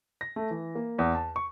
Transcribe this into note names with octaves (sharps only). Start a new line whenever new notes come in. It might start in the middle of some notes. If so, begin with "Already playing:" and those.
A#6
A3
E3
A#3
E2
A5
C#6